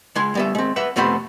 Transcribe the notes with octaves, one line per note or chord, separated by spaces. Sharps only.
C#2 G#3 G#5 C6
G3 B3 E5
G#3 C4
B4 E5 F#5
F2 C3 A3 B3 C5 B5